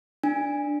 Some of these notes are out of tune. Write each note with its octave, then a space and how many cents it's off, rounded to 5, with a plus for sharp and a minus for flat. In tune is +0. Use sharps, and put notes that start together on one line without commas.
D4 +0 G#5 -25